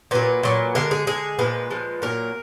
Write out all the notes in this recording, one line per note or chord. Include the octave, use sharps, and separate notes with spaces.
A#2 F#3 B4
A#2 F#3
D3 G#3 A#4
G#4
D3 G#3 G#4
A#2 F3 G#3 B4
A#2 F3 G#3
A#2 F#3 A#4